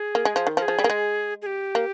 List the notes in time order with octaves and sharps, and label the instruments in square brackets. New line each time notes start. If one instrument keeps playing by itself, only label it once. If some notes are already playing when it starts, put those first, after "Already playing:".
Already playing: [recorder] G#4
[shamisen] A#3
G#3
F3
D#3
[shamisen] F3 [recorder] A#4
[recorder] G#4
[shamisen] F3
G3
A#3
G#3
[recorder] G#4
G4
[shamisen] A#3